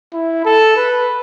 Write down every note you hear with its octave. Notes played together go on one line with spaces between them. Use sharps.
E4
A4
B4